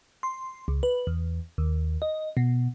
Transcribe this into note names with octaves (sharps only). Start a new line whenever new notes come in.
C6
C#2
B4
E2
D#2
D#5
B2